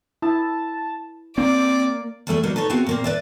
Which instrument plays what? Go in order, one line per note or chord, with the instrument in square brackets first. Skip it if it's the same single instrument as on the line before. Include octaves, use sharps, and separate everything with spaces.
[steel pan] E4 [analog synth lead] A5
[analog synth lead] A#3 [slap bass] C4 [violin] D5
[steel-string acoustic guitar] E2 G3 A3 G#4
F#3 G3 A#3 B3 D#4 F#4
D#4 A4 B4 C#5
B3 C4 E4 F#4 G#4 F5
A#2 A#3 C4
B4 D5 E5